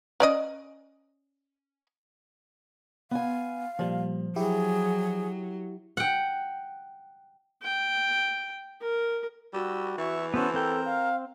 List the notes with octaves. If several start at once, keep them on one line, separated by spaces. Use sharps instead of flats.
C#4 D5 D#5
B3 F5 G#5
A#2 F3 G3
F#3 E4 G4 G#4
F#5 G5
G5
A#4
G3 F#4 E6
E3 E5 C#6
B3 C#4 F#4 A4 C5
C4 A4 A#4 G5
F5